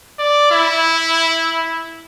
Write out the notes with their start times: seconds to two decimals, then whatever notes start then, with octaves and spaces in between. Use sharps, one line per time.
0.19 D5
0.52 E4